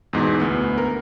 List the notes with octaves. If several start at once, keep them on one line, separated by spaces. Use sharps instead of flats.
E2 G#2 B2
D2 B3
A#4